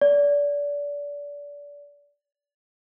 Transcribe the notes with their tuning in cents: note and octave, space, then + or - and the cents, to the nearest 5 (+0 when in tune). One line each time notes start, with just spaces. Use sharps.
D5 -25